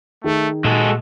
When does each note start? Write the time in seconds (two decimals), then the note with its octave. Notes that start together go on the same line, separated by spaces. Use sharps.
0.24 D#3 A3 G#4
0.65 A#2 G#3 F#4 A4